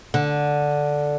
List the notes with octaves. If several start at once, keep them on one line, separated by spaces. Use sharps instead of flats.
D3